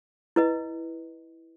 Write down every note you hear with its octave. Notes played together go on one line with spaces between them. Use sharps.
E4 B4 D#5